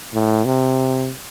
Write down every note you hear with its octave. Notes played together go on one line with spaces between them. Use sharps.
A2
C3